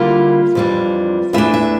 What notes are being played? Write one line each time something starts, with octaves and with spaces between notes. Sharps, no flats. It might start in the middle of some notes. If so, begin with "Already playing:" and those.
Already playing: D3 G3 A#3 E4 F4
F2 E3 G3 D4
E2 E3 A3 D4 E5
E5